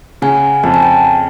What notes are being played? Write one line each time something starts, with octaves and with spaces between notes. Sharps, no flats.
C#3 F#5 G#5
F2 A5
G#5
G5 A5